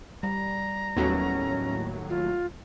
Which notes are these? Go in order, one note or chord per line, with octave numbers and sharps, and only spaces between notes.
G3 A#5
D#2 A2 F#3 B3 C#4
F4